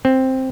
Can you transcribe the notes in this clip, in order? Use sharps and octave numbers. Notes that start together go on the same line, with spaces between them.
C4